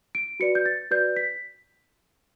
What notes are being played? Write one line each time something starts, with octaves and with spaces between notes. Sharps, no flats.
D7
F#4 B4 D5 C#7
G6
A6
F#4 B4 D5 G6
B6